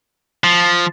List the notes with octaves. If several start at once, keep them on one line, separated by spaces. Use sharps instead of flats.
F3